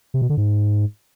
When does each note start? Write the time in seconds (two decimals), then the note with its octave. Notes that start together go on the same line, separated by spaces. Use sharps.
0.14 C3
0.22 B2
0.29 D3
0.37 G#2